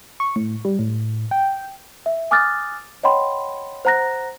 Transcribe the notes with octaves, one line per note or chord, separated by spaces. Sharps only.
C#6
A2
G3
A2
G5
E5
G#5 D6 D#6 F6 F#6 A6
C#5 D#5 F#5 G5 B5 C6
C5 F#5 A#5 F#6 A#6